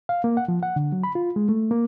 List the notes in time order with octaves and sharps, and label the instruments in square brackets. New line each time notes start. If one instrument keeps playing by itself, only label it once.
[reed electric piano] F5
A#3
F#5
F3
F#5
D3
F#3
B5
F4
G#3
A3
A#3